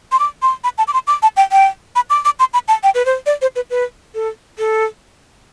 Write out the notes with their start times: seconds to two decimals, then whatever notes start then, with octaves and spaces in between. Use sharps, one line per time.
0.12 C6
0.19 D6
0.42 C6
0.64 B5
0.78 A5
0.88 D6
0.93 C6
1.07 D6
1.22 A5
1.37 G5
1.52 G5
1.96 B5
2.10 D6
2.25 D6
2.39 C6
2.53 B5
2.68 A5
2.83 G5
2.95 B4
3.05 C5
3.26 D5
3.42 C5
3.56 B4
3.70 B4
4.15 A4
4.58 A4